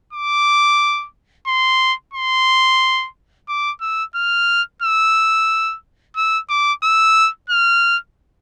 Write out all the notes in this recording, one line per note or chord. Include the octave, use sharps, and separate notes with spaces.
D6
C6
C6
D6
E6
F6
E6
E6
D6
E6
F6